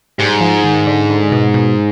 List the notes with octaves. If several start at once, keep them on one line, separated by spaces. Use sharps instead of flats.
G#2 G3
F3
D#3
D3
D3
B2
B2